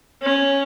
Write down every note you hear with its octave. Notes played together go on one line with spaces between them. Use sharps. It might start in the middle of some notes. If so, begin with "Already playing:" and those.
C#4